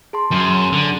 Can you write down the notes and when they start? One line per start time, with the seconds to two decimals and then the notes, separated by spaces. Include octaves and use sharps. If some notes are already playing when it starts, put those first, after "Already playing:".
0.13 G#4 A5 C6
0.32 F#2
0.73 D3